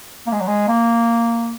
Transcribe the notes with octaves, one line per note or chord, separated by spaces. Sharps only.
A#3
G#3
F#3
G#3
A#3